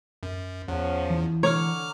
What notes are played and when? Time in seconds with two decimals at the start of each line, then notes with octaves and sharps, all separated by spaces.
0.23 F#2
0.68 E2 F3 C#4 F#5
1.10 E3 E4
1.43 D3 C#5 A#5 D6 F6